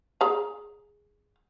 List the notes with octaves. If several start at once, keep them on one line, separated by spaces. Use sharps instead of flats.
G#4 A#5